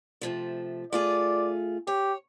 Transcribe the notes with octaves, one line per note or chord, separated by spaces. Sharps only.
C3 F3 A3
A3 F4 G#4 D5
G4 C#5